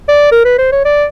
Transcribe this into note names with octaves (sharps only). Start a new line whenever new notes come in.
D5
A#4
B4
C5
C#5
D5